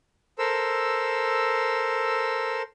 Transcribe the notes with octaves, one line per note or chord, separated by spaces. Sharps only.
A4 A#4 C5 E6